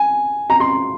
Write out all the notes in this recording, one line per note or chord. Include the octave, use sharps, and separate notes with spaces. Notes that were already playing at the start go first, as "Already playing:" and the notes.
Already playing: G#5
A#5
C6